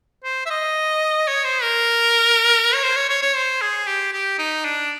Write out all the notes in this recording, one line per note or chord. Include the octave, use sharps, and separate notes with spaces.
C5
E5
D#5
C#5
C5
A#4
C#5
C5
C#5
C#5
C#5
C5
G#4
G4
G4
D#4
D4